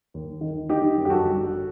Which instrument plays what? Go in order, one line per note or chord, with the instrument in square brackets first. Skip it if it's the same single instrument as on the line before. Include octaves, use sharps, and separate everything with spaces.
[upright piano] D#2
D#3
D3 D#4 G4
F#2
G4
F#4 A4
G1